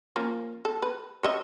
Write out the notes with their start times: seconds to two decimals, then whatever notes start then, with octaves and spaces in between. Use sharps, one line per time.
0.16 F3 A#3 C#4
0.65 A4
0.82 B4
1.23 C#5 D#5 E5